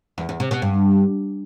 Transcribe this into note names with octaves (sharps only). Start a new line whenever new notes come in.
E2
E2
C3
B2
G2